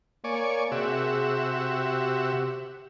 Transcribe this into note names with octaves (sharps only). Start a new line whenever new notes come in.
A#3 C#5 D5 G#5
C3 F#4 G#4 E5
G4